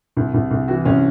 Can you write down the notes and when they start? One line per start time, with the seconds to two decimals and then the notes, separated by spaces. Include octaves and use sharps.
0.17 C2
0.34 C2
0.51 C2
0.68 E3 F#4
0.85 C2 C#4